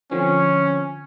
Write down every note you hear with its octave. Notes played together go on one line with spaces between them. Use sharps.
D3 F3 C4 C#4